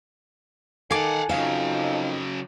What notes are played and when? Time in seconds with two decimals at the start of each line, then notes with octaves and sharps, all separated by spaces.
0.91 D#3 A4 F5 F#5 G#5 D6
1.29 F2 C#3 F3 F#3 D#4 F5